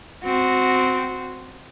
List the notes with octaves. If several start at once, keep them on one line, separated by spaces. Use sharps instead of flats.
C4 F#4